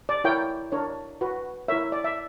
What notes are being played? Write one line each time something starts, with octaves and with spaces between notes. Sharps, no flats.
D5
E4 A#4 C#5 G5
D4 A#4 C#5
F#4 B4
E4 A#4 C#5 E5
D5
E5